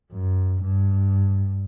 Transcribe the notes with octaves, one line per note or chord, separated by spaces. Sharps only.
F#2
G2